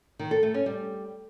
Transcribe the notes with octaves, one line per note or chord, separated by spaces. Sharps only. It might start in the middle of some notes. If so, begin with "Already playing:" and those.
D#3
A4
A3
C#4
G3